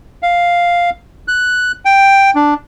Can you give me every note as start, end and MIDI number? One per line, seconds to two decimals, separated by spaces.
0.23 0.90 77
1.28 1.72 90
1.85 2.30 79
2.35 2.54 62